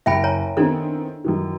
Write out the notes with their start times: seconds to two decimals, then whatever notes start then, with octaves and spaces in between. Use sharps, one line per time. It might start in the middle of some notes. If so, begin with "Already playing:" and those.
0.06 F#1 E5 G5 B5 D7
0.24 C#5 G#5 A#5
0.57 D#3 B3 C4 D4 E4 A4
1.24 F#2 D#3 E3